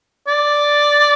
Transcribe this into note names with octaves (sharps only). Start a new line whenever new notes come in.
D5